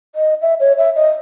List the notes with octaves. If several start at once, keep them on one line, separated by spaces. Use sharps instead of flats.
D#5
E5
C#5
E5
D#5